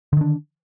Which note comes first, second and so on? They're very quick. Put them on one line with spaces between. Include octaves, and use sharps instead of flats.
D3 D#3 D4